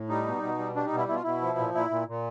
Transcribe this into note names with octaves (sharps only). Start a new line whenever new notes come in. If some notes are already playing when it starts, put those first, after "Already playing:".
Already playing: A2
G3 D#4
B2
B2
G3
G3 D4
D#4
B2 E4
B2 E4
F4
B2 E4
F3
A#2
A#2 E4
A#2
A#2